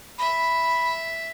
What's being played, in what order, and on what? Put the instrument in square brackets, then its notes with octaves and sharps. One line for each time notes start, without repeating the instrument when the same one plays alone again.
[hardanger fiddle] E5 [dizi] B5